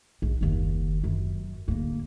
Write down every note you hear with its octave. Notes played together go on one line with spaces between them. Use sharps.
A#1
F#1 D#2
F#2
D1 A#3